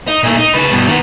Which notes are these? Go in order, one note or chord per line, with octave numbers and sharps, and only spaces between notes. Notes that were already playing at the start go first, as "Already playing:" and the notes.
D#4
A#2 A3
D#4
C#3 B4
G2 B2
D#3 B3